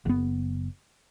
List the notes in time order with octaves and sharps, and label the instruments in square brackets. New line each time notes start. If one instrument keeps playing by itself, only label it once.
[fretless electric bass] F#1 B3